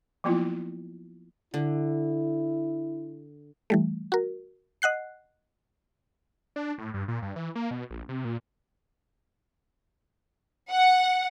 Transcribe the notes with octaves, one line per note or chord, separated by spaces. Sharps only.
F3 F#3 A#3 B3 E4 F4
D3 E4
E3 G3 A3
F#4 A#4
D#5 F#5 F#6 C7
D4
A2
G2
A#2
G2
E3
A#3
B2
A#1
C3
A#2
F#5